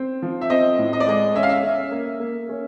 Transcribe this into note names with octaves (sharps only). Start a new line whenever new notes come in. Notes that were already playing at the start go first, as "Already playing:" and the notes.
Already playing: C4
F3
E5
C4 D#5
A2
D#5
D5
G#3 D#5
C#4 E5
F5
E5
C#4
A#3
A#3
C#4